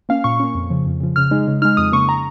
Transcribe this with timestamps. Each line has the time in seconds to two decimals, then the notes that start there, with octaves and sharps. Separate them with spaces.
0.09 A#3 C#4 F5
0.24 A#2 C#6
0.40 A#3 C#4
0.55 F2
0.70 C#3 F3
0.86 F2
1.01 C#3 F3
1.16 C#3 F6
1.31 G#3 D#4
1.48 C#3
1.62 D#4 F6
1.65 G#3
1.77 F2 D#6
1.93 C#3 A#3 C#6
2.09 A#5